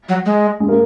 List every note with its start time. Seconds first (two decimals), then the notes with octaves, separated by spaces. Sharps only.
0.09 F#3
0.26 G#3
0.60 G#3
0.68 A#3